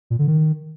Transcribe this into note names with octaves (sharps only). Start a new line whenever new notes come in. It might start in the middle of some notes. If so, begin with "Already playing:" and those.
A#2
D3
D#3